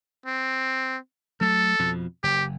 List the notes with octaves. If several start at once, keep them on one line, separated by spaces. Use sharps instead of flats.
C4
F#3 A3 A4
F2 B2 F3
F#1 G4